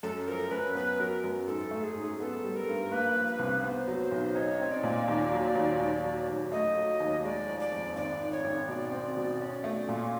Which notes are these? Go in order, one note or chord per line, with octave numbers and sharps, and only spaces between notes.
F#2 A4
F3 A#4
F#2 B4
B3 B4
F#3 A#4
F#2
G#2 A4
A3
G#4
G#2
B3 A4
G3
A#4
G2
A#3 B4
F3
B4
C2
B3 C5
F#3
C5
B1
D#4 C#5
C4
D5
A#2
D#2
F#3
D#2
D#2
F#3
D#2
A3 D#5
F#3
D#2
G#3 D5
F3
D5
F2
G#1 D5
D#3
C#5
G#1
B2 D5
C4
B2
C#4
A3
A#2